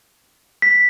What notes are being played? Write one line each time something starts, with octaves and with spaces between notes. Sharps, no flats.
B6